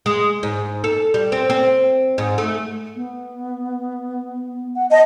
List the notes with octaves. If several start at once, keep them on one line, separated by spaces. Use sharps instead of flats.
G#3
G#2
A4
G3
C4
C4
G#2
A3
B3
F#5
D#5 A5